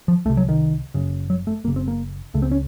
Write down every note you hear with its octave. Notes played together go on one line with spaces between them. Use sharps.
F3
C2 C3 A3
F#3
D#3
F#1 F#2 C#3
F#3
A3
F#1 F#2 C#3 A#3
C4
A#3
C#2 C#3 A3
C4
C#4